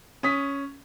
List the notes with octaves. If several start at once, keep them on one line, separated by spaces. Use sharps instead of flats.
C#4 D#6 B6